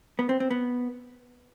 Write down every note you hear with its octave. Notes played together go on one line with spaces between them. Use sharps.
B3
C4
C4
B3